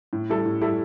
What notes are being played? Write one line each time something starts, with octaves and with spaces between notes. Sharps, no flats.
A2
G3 E4 A4
A2
G3 E4 A4